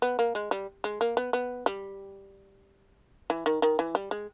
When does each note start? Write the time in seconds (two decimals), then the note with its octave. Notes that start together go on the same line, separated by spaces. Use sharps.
0.02 B3
0.19 A#3
0.35 G#3
0.51 G3
0.84 G#3
1.01 A#3
1.17 B3
1.33 B3
1.66 G3
3.30 E3
3.46 D#3
3.62 D#3
3.79 E3
3.95 G3
4.11 G#3